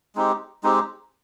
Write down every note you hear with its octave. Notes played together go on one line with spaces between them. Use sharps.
G#3 C4 D#4 G4
G#3 C4 D#4 G4